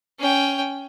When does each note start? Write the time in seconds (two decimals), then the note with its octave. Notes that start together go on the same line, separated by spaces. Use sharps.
0.20 C#4 G5